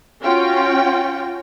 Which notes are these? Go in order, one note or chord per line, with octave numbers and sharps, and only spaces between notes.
C#4 F4 F#4 G5